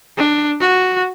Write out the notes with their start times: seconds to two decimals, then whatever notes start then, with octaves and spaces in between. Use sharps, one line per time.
0.18 D4
0.60 F#4